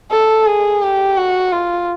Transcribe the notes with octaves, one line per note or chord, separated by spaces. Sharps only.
A4
G#4
G4
F#4
F4